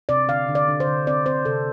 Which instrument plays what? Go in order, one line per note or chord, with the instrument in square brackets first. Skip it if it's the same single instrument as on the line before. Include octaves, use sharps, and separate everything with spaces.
[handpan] C3 D5
D3 F5
D3
D5
D3
C5
D3
C4 D5
C4 C5
C3 A4